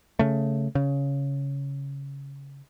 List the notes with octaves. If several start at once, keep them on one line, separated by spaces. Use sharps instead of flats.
C#3 A3
C#3